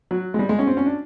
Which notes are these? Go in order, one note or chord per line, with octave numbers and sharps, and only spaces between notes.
F#3
G#3
G3
G#3
C#4
C4
C#4
D4